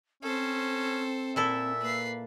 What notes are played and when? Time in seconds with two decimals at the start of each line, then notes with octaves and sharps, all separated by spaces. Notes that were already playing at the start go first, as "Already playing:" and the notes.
0.23 C4 C#4 A4 C5
1.36 A#2 E4 A4 E5
1.81 A#3 B4 C7